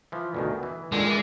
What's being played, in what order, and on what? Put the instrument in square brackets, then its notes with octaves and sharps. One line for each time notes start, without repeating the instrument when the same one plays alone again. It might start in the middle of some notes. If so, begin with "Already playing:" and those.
[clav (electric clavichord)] E3 F3
D2 B2 D#3
E3
[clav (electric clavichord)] A#2 D3 D#3 [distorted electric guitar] G#3
[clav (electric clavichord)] E3 D4